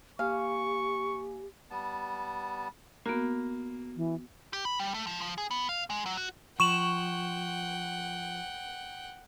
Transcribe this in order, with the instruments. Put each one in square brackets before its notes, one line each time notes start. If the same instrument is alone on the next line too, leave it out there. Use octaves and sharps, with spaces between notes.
[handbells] A#3 G#5 [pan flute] G4 [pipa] F5 [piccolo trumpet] C#6
[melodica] G3 B3 A5
[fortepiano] A#3 [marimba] B3 F#4
[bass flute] E3
[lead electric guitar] G4
B5
G3
A3
F3
F3
G#4
B3
F5
G#3
F#3
F#4
[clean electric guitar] F3 [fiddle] F#5 G5 [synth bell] C#6 E7 F#7